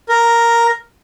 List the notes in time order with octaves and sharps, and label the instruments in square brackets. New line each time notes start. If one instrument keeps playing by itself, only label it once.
[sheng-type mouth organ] A#4